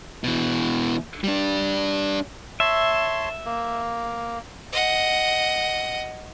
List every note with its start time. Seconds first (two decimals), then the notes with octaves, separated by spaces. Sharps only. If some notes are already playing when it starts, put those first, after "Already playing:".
0.24 B2 E3
1.24 G3 D4
2.60 C#5 E5 A5 C6
3.45 A#3
4.73 D#5 F#5